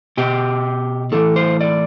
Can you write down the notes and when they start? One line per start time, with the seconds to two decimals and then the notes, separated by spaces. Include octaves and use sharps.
0.17 B2 G4
1.12 A2 E3 A4
1.36 C5
1.61 D5